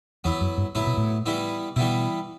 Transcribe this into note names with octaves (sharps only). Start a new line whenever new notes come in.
E2 F#3 B3 E4
F#2
G2
A2 F#3 B3 E4
B2
A2
E3 G3 B3 E4
B2 E3 G3 B3 E4